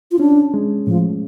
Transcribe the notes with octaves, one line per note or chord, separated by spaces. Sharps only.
F4
C#4 D4
G#3
A2 F3